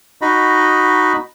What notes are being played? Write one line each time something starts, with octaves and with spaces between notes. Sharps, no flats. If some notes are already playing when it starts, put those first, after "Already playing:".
D#4 F#4 D#5 B5